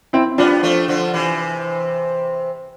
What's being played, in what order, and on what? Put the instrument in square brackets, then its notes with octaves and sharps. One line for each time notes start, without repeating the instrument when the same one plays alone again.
[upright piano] C4 E4
[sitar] G3 B3 [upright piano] D4 F4
[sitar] F3 A3
D3 F3
C3 E3